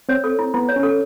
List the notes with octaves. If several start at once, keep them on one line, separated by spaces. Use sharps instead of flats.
C4 C#5
A4
E4
B3 E4
C#5
C#4
A4